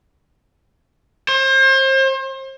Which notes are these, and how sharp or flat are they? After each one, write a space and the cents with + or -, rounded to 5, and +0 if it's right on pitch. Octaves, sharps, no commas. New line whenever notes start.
C5 +35